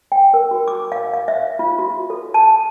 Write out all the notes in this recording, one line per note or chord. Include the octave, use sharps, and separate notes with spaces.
G5
A#4
F#4
D6
F5
F5
E5
F4
F#4
A4
A5